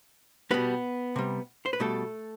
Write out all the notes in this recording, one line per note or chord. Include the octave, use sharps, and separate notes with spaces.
B2 G3 B3 B4
C3 G3
C5
B4
B2 G3 A3 A4